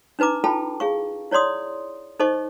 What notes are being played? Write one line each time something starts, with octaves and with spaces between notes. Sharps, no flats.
D4 D#4 B4 A#5 D6
E4 F4 A4 G5 A5 B5
G#4 F5 C#6
E4 C#5 D5 C6 D#6
D#4 A4 C5 D#5 C#6